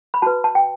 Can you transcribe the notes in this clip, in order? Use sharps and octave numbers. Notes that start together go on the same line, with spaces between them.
B5
F#4 B4 A5
A5
G5